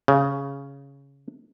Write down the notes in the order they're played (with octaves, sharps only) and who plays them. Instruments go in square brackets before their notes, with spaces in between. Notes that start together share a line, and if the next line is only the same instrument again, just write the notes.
[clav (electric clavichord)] C#3